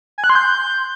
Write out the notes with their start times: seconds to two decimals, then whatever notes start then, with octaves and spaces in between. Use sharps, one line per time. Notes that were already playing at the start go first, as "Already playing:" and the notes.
0.18 G#5
0.24 F#6
0.30 C6
0.35 G6